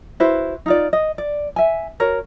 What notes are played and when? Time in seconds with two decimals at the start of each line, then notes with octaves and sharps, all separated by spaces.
0.20 E4 F#4 B4 C5
0.66 D#4 F4 D5
0.93 D#5
1.18 D5
1.56 E5 G#5
2.00 F#4 A#4 C#5